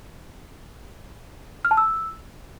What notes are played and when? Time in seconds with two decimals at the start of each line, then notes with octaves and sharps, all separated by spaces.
1.65 F6
1.71 A5
1.77 E6